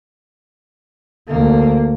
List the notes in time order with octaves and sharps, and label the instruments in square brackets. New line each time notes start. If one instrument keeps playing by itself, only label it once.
[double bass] D2 A#3